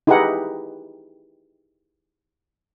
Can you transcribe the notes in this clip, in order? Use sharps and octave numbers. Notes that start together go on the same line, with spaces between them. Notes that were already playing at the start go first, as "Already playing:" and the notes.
D#4 E4 G4 G#4 B4 F#5